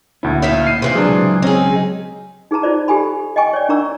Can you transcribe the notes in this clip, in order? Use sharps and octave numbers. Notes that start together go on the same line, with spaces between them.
D2 A#2 C#4 E4
D#4 E5 F5
C7 D#7
C3 E3 F4
C#2 F#3 D4 G#4
C4 C#4 D#4 G#4
D#4 G#4 B4 A5 A#5
D#4 F4 C5 D5
G4 A4 G#5 B5
D#5 G5 G#5 C#6
C#5 D5
C#4 D4 A#4 A#5 C#6 E6